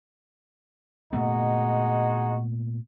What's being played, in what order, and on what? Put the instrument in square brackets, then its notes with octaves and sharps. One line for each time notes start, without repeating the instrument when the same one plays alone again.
[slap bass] A#2 A3 B3 [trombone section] G#3 D#4 F#4